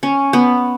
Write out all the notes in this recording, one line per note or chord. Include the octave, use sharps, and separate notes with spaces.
C#4
B3